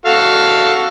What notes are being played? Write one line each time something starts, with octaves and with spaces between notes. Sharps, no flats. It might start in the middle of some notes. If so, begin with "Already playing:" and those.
F#4 A4 F5